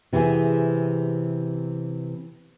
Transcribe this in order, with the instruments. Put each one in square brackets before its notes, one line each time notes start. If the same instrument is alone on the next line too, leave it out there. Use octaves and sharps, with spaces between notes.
[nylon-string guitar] C3 E3 B3 E4 G#4